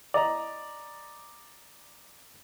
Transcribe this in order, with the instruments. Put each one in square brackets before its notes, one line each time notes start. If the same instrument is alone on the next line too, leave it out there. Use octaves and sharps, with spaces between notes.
[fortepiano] D5 D#5 A#5